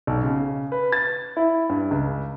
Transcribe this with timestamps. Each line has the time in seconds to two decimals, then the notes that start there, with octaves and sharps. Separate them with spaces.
0.07 B1
0.23 C#3
0.72 B4
0.92 A6
1.37 E4
1.69 G2
1.91 C#2